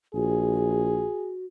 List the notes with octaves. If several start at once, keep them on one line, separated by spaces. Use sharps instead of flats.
A#1 F#4 G#4